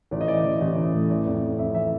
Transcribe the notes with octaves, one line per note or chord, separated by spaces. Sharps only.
A1 D5
D#5
E3 D5
A1
A1
A1
A2
E3 D5
F2
F2
F2 E5
E3 E5